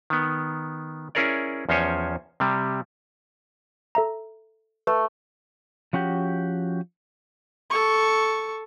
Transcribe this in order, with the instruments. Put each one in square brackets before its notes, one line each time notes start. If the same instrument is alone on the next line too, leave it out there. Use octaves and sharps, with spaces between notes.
[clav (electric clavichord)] D#3 B3
C#4 E4 G#4 A#4 C#5 D5
E2 F3 C#4 C5 C#5 G#5
C3 G3
[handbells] A4 E5 A#5
[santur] A3 [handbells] B4
[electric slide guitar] F3 C#4 F#4 G4
[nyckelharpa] A4 C#6